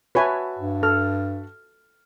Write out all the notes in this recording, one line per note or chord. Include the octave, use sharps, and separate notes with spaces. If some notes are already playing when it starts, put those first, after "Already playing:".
F#4 B4 C#5 E5 G#5 A5
G2
A4 F6